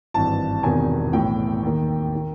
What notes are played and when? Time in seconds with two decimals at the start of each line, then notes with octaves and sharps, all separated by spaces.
0.14 G#1 G2 E3 A5
0.63 E1 E2 C3 D#3 G#5
1.13 B1 A2 E3 G5
1.63 D#2 D#3
2.15 D#3